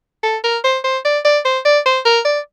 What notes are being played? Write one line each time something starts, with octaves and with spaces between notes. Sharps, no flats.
A4
A#4
C5
C5
D5
D5
C5
D5
C5
A#4
D5